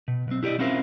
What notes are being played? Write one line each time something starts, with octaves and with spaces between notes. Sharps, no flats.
B2
B1 C4
E4 G4 A#4 D5 D#5
C4 C#4 E4 F4 A#4 C5